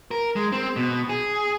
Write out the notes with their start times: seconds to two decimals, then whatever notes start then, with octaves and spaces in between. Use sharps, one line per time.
0.11 A#4
0.36 G#3
0.52 C4
0.76 B2
1.09 G#4